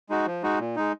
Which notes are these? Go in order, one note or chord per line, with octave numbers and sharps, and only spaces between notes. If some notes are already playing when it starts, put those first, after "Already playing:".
G#3 D#4 F#4
F3
G#3 D#4 F#4
A#2
G#3 D#4